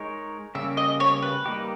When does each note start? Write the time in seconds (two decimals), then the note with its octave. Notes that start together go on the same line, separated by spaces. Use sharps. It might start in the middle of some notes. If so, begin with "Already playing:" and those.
Already playing: G#3 D#4 A#4 C#5
0.55 C#3 G3 A#3 C#4 G4 E5
0.77 D#5
1.00 C#5
1.22 B4
1.46 G3 A#3 D#4 G4